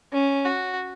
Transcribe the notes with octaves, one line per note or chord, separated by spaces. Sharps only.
C#4
F#4